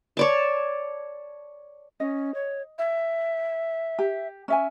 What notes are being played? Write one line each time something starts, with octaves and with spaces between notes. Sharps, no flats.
C#5 D5 A5
C#4 D#5
C#5
E5
G4
C#4 E5 G#5